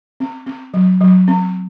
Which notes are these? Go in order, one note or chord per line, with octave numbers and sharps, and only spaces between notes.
C4
C4
F#3
F#3
C4